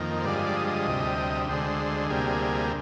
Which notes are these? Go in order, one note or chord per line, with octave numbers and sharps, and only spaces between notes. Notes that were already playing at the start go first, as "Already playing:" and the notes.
Already playing: F2 D#3 A#3
C5
G2 D3 F3 G#3 D5
D#5
D5
D#5
D2 C3 G3
D2 D3 G#3 C5
D2 C3 G3 A#3 G#4